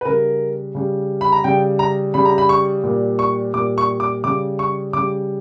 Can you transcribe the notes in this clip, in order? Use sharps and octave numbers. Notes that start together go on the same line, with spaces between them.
B4
C#3 G3 A#4
C#3 G3
B5
A#5
C#3 G3 G5
A#5
C#3 G3 B5
A#5
B5
C#6
A#2 G3
C#6
A#2 G3 D6
C#6
D6
C#3 G3 D6
C#6
C#3 G3 D6